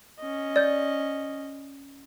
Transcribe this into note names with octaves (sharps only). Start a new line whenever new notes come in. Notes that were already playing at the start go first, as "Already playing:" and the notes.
C#4 D#5
D5 G6